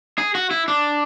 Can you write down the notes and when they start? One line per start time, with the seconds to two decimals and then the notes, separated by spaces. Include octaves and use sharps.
0.18 G#4
0.35 F#4
0.51 E4
0.68 D4